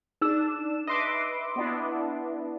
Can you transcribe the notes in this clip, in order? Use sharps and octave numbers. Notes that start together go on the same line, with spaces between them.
D4 D#4 G#4 E6 E7
B4 D#5 E5 C6 D6
B3 D4 E4